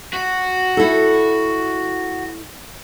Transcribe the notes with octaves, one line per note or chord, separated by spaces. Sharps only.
F#4
E4 A4